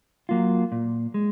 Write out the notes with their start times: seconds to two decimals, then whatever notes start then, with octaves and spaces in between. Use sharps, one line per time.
0.29 F#3 A#3 F4
0.72 A#2
1.14 G#3